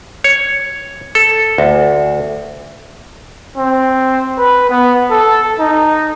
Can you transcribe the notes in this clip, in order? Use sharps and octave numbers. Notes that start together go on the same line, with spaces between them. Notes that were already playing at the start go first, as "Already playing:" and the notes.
C#5
A4
D2
C4
B4
B3
A4
D#4